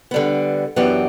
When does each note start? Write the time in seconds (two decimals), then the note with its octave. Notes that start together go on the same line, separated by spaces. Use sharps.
0.11 D3 G3 B3
0.76 F#2 E3 B3 D4 G4